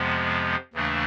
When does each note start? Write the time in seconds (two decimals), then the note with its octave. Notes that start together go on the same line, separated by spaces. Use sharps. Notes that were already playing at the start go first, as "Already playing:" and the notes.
Already playing: F2 C3 F3 G#3 B3
0.73 D#2 C#3 E3 A3 D4